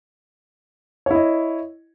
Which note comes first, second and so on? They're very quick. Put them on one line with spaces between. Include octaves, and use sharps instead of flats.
C#5 E4 D#5